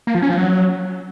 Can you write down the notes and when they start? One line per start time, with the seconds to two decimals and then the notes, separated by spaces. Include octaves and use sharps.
0.07 A#3
0.15 F3
0.22 C#4
0.30 F3
0.37 F#3